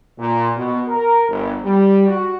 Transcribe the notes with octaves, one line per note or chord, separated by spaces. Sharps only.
A#2
B2
A#4
G1
G3
F#4